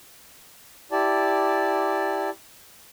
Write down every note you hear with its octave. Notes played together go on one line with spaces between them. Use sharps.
E4 G4 D5 A5